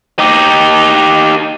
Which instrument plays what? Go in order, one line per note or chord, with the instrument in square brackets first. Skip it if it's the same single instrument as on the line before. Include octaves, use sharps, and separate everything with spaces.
[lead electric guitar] D#4 G4